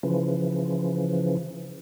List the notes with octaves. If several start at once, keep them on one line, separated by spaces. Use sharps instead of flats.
C#3 E3 F3